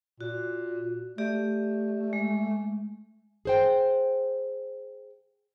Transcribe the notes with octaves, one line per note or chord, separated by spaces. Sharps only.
A#2 F#4
A3 G4 D5
G#3
G#4 C5 G5